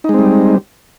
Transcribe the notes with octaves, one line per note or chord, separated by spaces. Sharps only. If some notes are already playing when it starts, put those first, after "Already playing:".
G3 G#3 C4 D#4